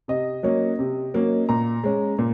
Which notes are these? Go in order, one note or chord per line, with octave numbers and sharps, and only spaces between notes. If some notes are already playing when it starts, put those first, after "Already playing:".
C3 D#5
F#3 A#3 C#4
C3
F#3 A#3 C#4
A#2 A#5
G#3 C#4
A#2